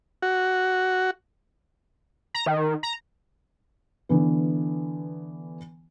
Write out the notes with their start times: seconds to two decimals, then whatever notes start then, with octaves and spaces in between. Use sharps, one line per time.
0.22 F#4
2.35 A#5
2.46 D#3
2.83 A#5
4.09 D3 E3 B3